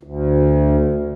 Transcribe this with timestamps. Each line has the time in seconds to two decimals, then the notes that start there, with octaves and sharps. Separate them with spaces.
0.03 D2